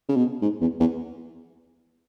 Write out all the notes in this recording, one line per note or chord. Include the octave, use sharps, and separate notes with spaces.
C#3
B2
G#2
E2
E2